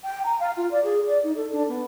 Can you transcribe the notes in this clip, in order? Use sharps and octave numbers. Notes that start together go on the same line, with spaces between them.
G5
A#5
F5
F4
D5
G#4
D5
D#4
A4
D4
B3